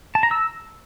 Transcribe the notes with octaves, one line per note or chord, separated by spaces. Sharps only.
A5
A#5
E6